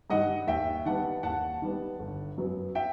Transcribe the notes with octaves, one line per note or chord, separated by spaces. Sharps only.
G2 D#3 D#5 F#5
D#2 E5 G5
D#3 G3 B3 F#5 A5
D#2 F#5 A5
D#3 G3 B3
G1
F#2 F#3 B3
E5 G5